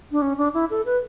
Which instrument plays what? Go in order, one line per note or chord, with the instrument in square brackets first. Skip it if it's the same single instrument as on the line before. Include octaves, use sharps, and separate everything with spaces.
[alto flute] D4
C#4
D4
E4
A4
B4